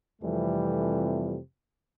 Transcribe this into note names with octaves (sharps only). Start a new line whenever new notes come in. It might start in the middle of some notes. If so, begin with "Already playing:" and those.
F2 C3 E3 F3 G3 A3